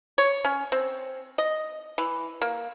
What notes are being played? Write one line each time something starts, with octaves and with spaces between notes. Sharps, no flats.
C#5
C#4
C4
D#5
E3
A#3